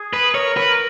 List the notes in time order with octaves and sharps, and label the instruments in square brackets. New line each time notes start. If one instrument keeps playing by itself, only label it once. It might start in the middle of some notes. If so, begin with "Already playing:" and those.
Already playing: [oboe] G#4
[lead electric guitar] B4
[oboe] A#4 [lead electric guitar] C#5
[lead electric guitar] B4